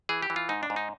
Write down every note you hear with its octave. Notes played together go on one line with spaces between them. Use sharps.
E3 G#4
G4
E3
F4
G#2 D#4
D4
G#2
D#4